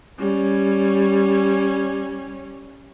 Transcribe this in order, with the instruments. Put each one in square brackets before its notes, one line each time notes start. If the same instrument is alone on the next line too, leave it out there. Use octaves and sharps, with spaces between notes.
[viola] G3 C#4